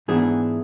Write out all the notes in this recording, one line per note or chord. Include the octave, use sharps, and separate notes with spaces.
G#2 E3 B3 D4 G#4